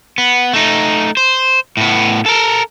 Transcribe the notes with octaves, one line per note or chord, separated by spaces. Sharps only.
B3
A3 D#4
C5
A2 B3
A4 A#4